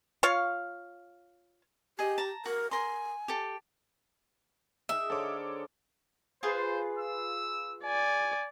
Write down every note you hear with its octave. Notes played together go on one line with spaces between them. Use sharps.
F4 C#5 F5
G4 G#4 D#5
A5 A#5
F#4 A#4
A#4 G#5 C6
G4 A4
D#4 G#4 A#4 E5
D3 G#4 A4 C5 C#5 D6
F4 G#4 B4 C5
E6
D5 G#5